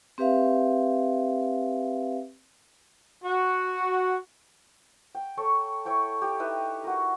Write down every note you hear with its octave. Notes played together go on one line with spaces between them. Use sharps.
C4 G4 B4 E5 F5
F#4
G5
A4 C#5 C#6
E4 C#5 G5 C#6
G4
D#4 E4 B4 E5
F#4 A#4